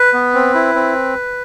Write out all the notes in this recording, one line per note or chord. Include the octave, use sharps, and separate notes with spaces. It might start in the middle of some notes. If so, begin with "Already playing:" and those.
Already playing: B4
B3
C4
E4
C4